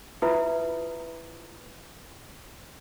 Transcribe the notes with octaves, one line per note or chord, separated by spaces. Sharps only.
E4 F4 B4 E5 B5 D#6